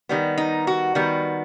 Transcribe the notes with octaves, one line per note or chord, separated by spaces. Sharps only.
D#3 G3 B3
D#4
F#4
D#3 G3 B3